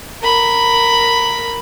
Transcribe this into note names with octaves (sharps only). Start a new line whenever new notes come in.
A#4 B5